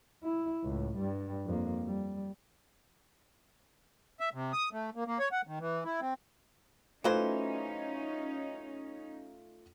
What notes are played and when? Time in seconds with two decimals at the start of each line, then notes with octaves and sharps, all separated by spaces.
0.23 E4
0.64 C#2 A2
0.97 G2 G3
1.46 F2 A#3
1.86 G3
4.20 E5
4.34 C3
4.53 D#6
4.72 A3
4.95 A#3
5.07 A#3
5.19 C#5
5.32 F#5
5.47 D#3
5.60 E3
5.84 E4
6.01 C4
7.04 E3 F#3 A3 C#4 D#4 F4 C5